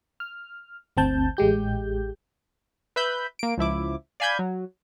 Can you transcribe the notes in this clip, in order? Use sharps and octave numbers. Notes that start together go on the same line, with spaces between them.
F6
G1 D2 C4 A5 G6
A1 G#3 G4 G6
B4 E5 B5 G6
A#3 D7
C#2 F3 E4 D6
D5 F5 G#5 B5 G6 G#6
F#3